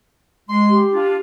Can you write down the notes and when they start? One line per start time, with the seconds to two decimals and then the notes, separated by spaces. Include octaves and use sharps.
0.49 G#3 C6
0.70 G4
0.93 D4 F4